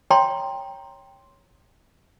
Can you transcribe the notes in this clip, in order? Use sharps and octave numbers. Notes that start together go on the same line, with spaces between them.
C#5 G5 A#5 C6